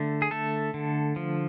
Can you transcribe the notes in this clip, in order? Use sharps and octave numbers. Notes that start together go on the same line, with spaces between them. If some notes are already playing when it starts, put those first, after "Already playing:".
Already playing: D3 A3
G#4
A3 A4
D3
F3